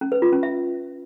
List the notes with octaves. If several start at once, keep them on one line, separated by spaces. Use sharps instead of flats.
C#4
B4
F4
C#4
E5